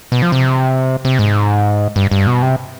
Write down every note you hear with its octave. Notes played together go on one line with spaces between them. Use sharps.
B2
F3
C3
C3
G#2
G2
G2
B2
C3